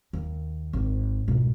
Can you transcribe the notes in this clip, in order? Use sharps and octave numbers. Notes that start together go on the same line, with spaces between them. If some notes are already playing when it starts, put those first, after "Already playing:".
D#2
G#1
G#2 B2